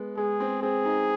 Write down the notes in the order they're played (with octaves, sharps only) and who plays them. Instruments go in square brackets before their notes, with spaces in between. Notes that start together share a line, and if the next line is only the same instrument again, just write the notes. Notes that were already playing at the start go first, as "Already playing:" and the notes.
Already playing: [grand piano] G#3 B3
[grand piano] G#3 [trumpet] G#4
[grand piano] C4
[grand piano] C4 [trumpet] G#4
[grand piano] D#4